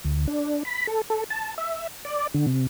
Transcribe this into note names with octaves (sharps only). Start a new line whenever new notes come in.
D2
D4
B5
A4
A4
A5
E5
D5
D3
C3